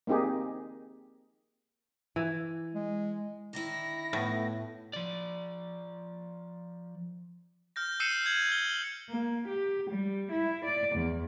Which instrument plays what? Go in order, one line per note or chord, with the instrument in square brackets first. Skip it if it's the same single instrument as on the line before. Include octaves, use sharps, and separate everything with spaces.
[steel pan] A#3 C4 D#4 G4 G#4
[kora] E3
[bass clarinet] G#3
[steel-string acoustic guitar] D3 D#3 E4 [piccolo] A#6
[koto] A2 [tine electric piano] A3 B3
[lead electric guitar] F3 D5
[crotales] F6 G6 A#6
E6 G6 C7 C#7 D#7 E7
G6 G#6 F#7
F6 G7
[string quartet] A#3
G4
G3
E4
D5
E2